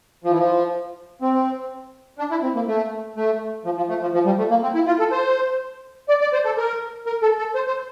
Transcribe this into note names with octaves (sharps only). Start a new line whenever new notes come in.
F3
E3
F3
C4
D4
E4
C4
A#3
A3
A3
F3
F3
A3
F3
F3
G3
A3
A#3
C4
E4
F4
A4
C5
D5
D5
C5
A4
A#4
A#4
A4
A4
C5
C5